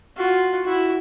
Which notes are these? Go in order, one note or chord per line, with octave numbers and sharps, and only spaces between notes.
F4 F#4
E4 F#4